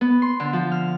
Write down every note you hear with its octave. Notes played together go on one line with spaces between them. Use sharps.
B3
C6
D3
F3
F6